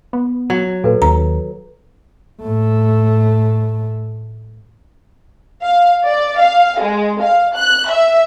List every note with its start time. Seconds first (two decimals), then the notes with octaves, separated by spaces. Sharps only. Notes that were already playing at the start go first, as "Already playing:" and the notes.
0.13 B3
0.50 F#3
0.84 A#2 A4 B4
1.02 D#2 A#5
2.42 A2 A3
5.62 F5
6.07 D5
6.40 F5
6.79 G#3
7.22 F5
7.56 F#6
7.90 E5